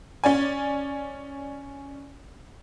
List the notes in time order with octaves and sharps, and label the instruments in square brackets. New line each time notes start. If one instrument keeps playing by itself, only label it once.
[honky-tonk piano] C#4 D5 G#5